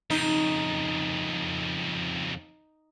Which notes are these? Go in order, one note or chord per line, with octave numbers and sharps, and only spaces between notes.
F2 C#3 D#4